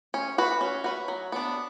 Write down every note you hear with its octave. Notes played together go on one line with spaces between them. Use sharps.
C#4
F#4 B4
C#4
F#4 B4
F#3
B3 D4